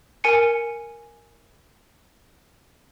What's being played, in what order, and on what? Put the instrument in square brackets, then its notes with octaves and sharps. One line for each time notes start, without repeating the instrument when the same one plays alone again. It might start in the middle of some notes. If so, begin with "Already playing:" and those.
[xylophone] A#4 G#5 C#7